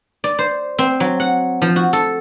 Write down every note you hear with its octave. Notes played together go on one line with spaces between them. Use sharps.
D5
C5
C4
F#3
F#5
F3
F#4
A4